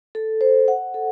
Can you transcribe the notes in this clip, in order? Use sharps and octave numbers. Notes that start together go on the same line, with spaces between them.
A4
C5
F#5
A4